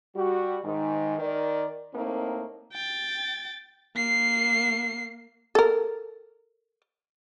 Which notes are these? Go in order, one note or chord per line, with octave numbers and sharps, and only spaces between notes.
G3 F#4
G#2 D#3
D#3 A#4 D5
A2 A#3 C4 D#4
G5 A6
A#3 C7
A4 A#4